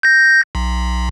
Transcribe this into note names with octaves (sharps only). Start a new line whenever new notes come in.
G6 A#6
B1